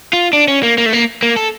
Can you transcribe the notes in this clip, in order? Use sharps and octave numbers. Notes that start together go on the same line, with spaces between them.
F4
D4
C#4
A#3
A#3
A3
A#3
A#3
A4